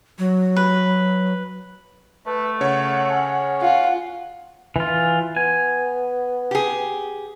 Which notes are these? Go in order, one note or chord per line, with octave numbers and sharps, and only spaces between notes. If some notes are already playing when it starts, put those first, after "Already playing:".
F#3
B4
A3 B4
C#3 C#5 F#5
C#4
F4 F#5
E3 F4
B3 G#5
G4 G#4